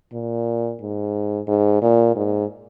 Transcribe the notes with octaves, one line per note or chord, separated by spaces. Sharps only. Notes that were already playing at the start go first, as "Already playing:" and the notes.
A#2
G#2
G#2
A#2
G#2